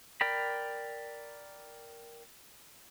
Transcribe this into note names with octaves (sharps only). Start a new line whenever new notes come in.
A#4 D5 G5 B5